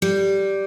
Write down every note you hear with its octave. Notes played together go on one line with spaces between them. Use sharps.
G3